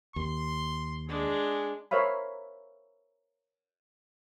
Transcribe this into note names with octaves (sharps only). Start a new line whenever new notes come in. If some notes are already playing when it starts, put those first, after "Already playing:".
D#2 C6
G#3 D4 G#4
A#4 C5 C#5 E5 F5 B5